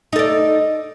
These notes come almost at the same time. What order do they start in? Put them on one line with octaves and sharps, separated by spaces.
D#4 A4 D5